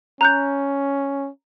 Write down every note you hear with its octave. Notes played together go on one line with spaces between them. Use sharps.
C#4 A#5 F#6 G6